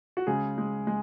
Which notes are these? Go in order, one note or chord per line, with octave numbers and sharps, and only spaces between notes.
F#4
C#3 G#3 G#4
G#3
G#3